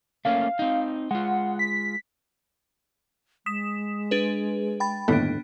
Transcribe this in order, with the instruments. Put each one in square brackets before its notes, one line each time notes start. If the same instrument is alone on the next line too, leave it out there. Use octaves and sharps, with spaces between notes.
[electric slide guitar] A3 A#3 C#4 [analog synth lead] F5
[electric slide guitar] C4 D#4
[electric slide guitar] G#3 F4 [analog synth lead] F#5
[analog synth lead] B6
[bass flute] G#3 [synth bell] D#6 B6 E7
[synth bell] D4 G#4 B4
G5 B5 A6
[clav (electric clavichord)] G1 D#2 A2 [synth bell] B3 D4